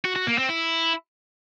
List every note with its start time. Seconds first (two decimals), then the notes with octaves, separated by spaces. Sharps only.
0.05 F#4
0.16 F#4
0.27 A#3
0.38 C4
0.49 E4